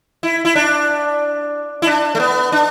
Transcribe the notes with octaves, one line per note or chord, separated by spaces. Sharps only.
E4
E4
D4
E4
D4
A3
B3
D4